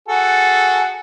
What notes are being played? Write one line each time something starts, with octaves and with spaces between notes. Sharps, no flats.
F#4 G#4 A4